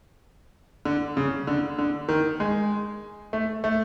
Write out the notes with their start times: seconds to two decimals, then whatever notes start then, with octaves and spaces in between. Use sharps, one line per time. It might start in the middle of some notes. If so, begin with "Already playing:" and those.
0.85 D3
1.17 C#3
1.47 D3
1.79 D3
2.09 D#3
2.40 G#3
3.33 A3
3.64 A3